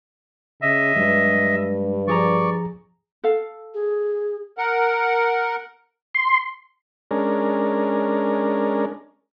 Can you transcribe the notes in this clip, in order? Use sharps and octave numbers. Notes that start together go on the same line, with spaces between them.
C#3 D#5 E5
G2 F#3 G#3
F3 G#4 D5 A#5 C#6
A4 F5
G#4
A#4 F#5
C6
G#3 C#4 D4 A#4